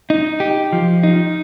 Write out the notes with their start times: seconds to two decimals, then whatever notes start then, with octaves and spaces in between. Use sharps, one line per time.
0.10 D#4
0.40 G4
0.73 F3
1.03 D#4